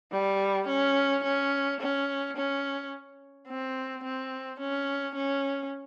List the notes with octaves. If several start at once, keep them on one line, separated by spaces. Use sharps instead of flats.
G3
C#4
C#4
C#4
C#4
C4
C4
C#4
C#4